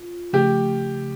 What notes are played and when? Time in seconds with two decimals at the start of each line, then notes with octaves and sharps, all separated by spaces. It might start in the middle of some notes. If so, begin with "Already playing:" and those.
Already playing: F4
0.33 C#3 F3 A3 G4